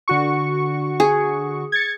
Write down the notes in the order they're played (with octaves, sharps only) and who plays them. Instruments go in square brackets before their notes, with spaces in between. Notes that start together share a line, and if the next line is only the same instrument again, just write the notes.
[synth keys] D3 F#4 C#6
[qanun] G#4
[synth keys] G#6 A6 C#7